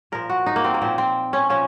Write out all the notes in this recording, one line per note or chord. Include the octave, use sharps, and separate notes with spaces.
A#2 F3 A#4
F#4
D#4
A#3
C4
A#3
A#2 F3 C4
C4
C#4
A#2 F3 C#4